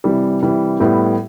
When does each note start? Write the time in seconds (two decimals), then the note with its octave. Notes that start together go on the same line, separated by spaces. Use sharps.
0.04 C3 E3 G3
0.42 C3 E3 G3
0.80 A2 G3 B3 E4